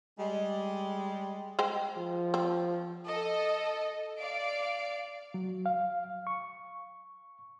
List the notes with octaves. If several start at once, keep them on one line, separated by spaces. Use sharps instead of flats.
G3 G#3
G#3 C5 G5
F3
C4
A4 D#5
D5 F5 D7
F#3
F5
C#6